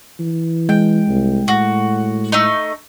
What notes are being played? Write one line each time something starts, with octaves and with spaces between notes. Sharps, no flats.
E3
G#3 G5
C2
A2 F#4
A3 D#4